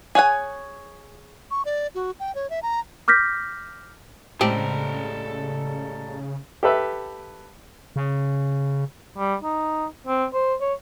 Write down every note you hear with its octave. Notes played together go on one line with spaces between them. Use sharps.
G#4 C#5 F#5 G#5
C#6
D5
F#4
G5
C#5
E5
A#5
D6 F6 G6 A#6 B6
A2 C#3 G3 G#3 C4 G4 A4 A#5
G4 A4 B4 E5
C#3
G3
D#4
C4
C5
C#5